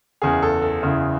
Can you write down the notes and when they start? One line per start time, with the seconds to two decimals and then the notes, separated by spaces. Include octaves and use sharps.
0.22 F#1 E2 C#3 E3 G#4
0.42 A4
0.62 A4
0.82 F#1 E2 C#3 E3